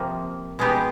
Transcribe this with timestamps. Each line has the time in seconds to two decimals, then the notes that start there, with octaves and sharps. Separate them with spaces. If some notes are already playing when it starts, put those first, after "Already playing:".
Already playing: C3 F3 A#3
0.59 B2 G#3 B3 D#4 G4